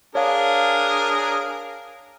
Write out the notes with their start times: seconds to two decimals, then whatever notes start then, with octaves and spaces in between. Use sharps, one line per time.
0.15 D4 G#4 A#4 C#5 F5